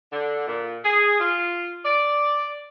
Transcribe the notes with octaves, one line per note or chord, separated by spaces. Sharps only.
D3
A#2
G#4
F4
D5